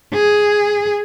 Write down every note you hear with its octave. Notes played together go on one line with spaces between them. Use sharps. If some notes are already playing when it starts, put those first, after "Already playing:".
G#4